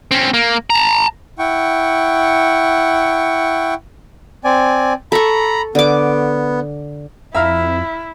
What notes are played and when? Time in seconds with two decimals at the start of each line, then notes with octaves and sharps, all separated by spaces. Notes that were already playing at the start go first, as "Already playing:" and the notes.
0.11 C4 C#4
0.34 A#3
0.70 A5 A#5
1.39 E4 F#5 G5 C#6
4.44 C4 D5 G#5
5.12 A4 A#5 B5 C#6
5.75 D3 B3 D6
7.35 F2 E4 E5 F5 A#5 E6